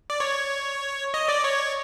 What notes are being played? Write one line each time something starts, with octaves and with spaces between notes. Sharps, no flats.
D5
C#5
D#5
D5
C#5